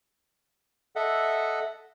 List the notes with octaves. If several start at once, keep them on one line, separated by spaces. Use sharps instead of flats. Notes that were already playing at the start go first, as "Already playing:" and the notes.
A4 D#5 E5 F#5